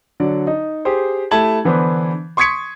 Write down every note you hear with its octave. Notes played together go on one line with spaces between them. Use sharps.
D3 F#3 D5
D#4
G4 G#4 C5
A3 E4 G4 A5 G#6 F#7
D3 E3 B3 D4 C5
C6 C#6 D#6 G#6 B6 C#7